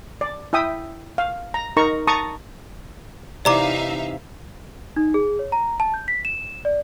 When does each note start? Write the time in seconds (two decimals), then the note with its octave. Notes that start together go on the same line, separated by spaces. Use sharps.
0.21 D5
0.53 E4 E5 G5 D#6
1.18 F5
1.54 A#5
1.77 D#4 A#4 A#5 C#6
2.07 A5 A#5 C#6 D#6
3.45 C3 E3 D#4 D5 E5 F5 A#5 D6
4.96 D#4
5.14 G#4
5.39 C#5
5.52 A#5
5.80 A5
5.94 G6
6.08 B6
6.25 E7
6.65 D5